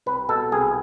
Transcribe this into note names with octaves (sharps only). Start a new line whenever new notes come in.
C2 B4
B2 A4
C2 G#4